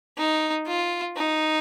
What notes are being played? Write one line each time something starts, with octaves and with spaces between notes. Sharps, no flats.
D#4
F4
D#4